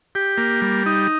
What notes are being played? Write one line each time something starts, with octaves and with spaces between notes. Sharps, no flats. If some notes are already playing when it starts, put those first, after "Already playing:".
G4
A#3
G3
D#4